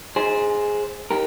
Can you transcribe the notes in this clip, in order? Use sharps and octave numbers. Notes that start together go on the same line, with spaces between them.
G#4 C5
G4 A#4